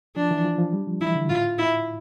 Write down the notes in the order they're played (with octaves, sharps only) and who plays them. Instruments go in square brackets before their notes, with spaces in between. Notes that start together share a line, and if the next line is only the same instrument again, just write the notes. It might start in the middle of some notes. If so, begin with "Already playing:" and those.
[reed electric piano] F3 [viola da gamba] D4
[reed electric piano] E3
F3
F3
G3
F3
[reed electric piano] E3 [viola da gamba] E4
[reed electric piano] D3
[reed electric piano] A2 [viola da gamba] F4
[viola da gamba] E4